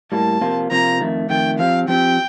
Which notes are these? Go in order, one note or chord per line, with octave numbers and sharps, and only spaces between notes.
A2 G3 A#3 A5
C3 F3 A#3 F4
C3 F3 A#3 F4 A#5
F2 D#3 A3
F2 D#3 A3 G5
F3 C4 G4 F5
F3 C4 G4 G5